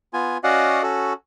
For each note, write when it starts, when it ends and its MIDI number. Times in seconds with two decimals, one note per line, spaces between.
0.13 0.38 59
0.13 0.38 65
0.13 0.38 80
0.44 0.82 61
0.44 0.82 66
0.44 0.82 74
0.44 0.82 75
0.44 0.82 77
0.44 0.82 78
0.83 1.13 61
0.83 1.13 66
0.83 1.13 69